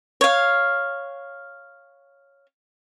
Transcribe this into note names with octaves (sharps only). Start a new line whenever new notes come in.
C#5 F5